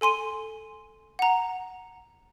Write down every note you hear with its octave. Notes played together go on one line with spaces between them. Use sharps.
A4 G#5 C6 D#7
F#5 A#5